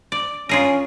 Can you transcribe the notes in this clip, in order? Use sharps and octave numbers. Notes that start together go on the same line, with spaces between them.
D5
C#4 F4 G#4 A#4